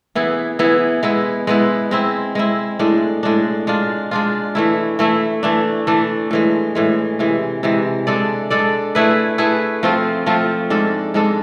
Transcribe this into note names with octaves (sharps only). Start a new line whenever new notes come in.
E3 B3 E4 G#4
E3 B3 E4 G#4
G#3 B3 E4
G#3 B3 E4
G#3 C4 E4
G#3 C4 E4
A2 G#3 D4
A2 G#3 D4
G#3 D4 F4
G#3 D4 F4
E3 A3 E4
E3 A3 E4
E3 A3 D4
E3 A3 D4
A2 E3 G#3
A2 E3 G#3
C3 E3 G#3
C3 E3 G#3
G#3 D4 A4 D5
G#3 D4 A4 D5
A3 E4 G#4 B4
A3 E4 G#4 B4
F3 A3 C4 F4
F3 A3 C4 F4
G#2 G#3 D4 A4
G#2 G#3 D4 A4